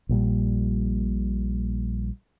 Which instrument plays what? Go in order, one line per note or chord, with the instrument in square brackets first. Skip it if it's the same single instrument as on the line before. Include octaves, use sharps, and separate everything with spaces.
[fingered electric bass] A#1 A#2 F3 G3